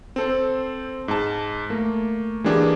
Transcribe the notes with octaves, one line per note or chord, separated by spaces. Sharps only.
C4 A4 C5
G#2 A5
A3 A#3
E3 G#3 A#3 D4 G4 G#4